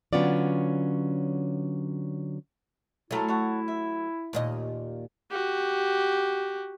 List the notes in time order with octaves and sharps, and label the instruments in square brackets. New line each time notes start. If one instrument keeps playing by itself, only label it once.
[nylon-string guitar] D3 F#3 B3 C#4 F4 D5
[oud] F#3 A3 [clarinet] E4 [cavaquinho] A4 A#4 G#5
[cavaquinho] A4 C#5 F#5
E5
[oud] D#2 A#2 D#5
[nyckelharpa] F#4 G4